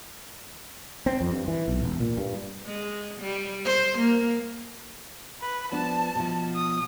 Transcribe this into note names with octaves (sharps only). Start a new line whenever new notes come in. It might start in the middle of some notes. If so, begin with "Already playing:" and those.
C4
F2
G2
E3
B1
E1
A#2
G2
G#3
G3
C5
A#3
B4
F3 B3 D4 A5
B2 F3
D#6